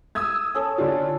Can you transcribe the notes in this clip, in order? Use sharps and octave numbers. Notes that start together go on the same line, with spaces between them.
D#6 E6 G#6
C#4 A4
D3 D4 F4